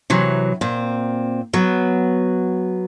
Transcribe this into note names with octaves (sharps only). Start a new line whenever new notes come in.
C3 E3 F#3
A#2 C4
F#3 B3